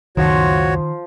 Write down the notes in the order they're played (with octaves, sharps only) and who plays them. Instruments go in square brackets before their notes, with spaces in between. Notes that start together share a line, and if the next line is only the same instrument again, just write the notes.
[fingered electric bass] C#2 F#2 A#2 [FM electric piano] D#3 [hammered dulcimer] F3 [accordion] F#4 C#5